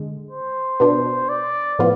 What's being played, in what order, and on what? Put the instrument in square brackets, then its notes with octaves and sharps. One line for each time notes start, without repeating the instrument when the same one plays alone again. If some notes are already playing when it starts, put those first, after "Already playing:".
Already playing: [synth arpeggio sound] D3 G#3
[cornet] C5
[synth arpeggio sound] B2 B3 D4
[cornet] D5
[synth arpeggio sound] A2 F3 B3 F4